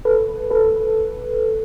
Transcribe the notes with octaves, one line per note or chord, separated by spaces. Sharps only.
A4 B4
A4 B4